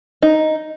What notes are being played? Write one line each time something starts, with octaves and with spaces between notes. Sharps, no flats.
D#4